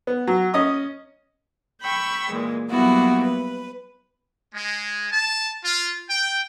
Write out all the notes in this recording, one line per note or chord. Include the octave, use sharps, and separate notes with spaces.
B3
F#3
C#4 D#5 D#6
G5 B5 C#6 E6
A#2 E3 G#3
F#3 G3 A#3 B3 E4 F#4
B4
G#3
A5
F4
G5